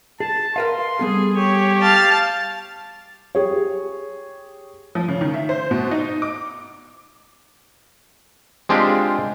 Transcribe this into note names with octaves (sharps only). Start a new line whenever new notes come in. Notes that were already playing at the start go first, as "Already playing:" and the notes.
G#4 A5
A#4 B4 F5 C6
G3 B3 G#4 A4
G4 C#5
F5 A5
G4 G#4 C#5
F3
C#3
D#3
E5
C5
B2
D#4
D6
G#3 C4 D4 F4 G4